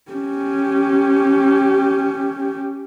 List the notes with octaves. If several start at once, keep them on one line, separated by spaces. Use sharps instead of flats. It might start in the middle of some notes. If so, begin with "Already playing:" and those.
C#4 G4